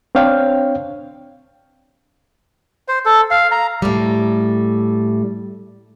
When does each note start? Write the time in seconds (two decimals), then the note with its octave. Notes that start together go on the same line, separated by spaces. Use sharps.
0.15 C4 D4 C#5 F5 G5
2.88 C5
3.05 A4
3.31 F5
3.51 A#5
3.82 A2 G3